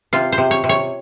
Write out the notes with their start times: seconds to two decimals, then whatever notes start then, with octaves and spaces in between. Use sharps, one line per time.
0.13 C3 F4
0.32 C5
0.38 C3
0.51 C#5
0.64 C3
0.69 C#5